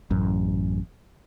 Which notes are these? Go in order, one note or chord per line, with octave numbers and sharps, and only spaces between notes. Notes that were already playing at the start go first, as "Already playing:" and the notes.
A1 F#2